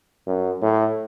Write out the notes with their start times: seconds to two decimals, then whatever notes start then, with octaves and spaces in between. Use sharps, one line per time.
0.27 F#2
0.62 A2